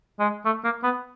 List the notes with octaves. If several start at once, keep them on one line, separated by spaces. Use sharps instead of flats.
G#3
A3
A#3
B3